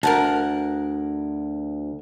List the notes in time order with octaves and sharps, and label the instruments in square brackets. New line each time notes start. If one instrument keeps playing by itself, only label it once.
[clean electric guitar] D2 [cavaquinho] A#4 F#5 A5